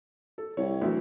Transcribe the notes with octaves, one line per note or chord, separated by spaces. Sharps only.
A4
C2 C#5
D2 E3 F#3